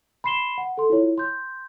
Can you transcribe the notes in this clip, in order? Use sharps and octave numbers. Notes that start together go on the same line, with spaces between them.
B5 C6 C7 E7 G7
F#5
A4 C6
E4 F4 C#5
C6 G6